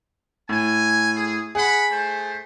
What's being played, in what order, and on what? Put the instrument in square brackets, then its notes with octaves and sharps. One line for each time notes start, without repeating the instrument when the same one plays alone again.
[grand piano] A2 [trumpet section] G#5
[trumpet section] G#4
[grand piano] G#4 [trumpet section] F#5 B5
[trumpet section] A3 C5